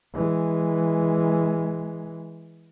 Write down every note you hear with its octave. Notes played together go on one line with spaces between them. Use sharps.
E3 G#3